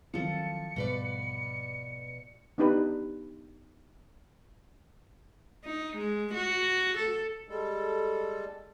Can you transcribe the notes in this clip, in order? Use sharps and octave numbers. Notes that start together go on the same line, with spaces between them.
D#3 F3 F#3 C4 A4 C#7
G#2 B2 G3 B4 D5
B3 D4 D#4 G4 B4
D#4
G#3
F#4
A4
G3 G#3 A4